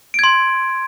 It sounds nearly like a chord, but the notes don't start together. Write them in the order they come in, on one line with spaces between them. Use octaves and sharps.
D7 G#6 C6